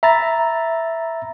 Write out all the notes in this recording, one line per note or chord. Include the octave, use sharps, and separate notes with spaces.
E5 A#5 B5 A6